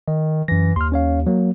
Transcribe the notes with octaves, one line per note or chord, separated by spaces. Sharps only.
D#3 D#5
F#2 E3 A#6
D#2 C6 F6
C#4 C#5 F5
F#3 A#3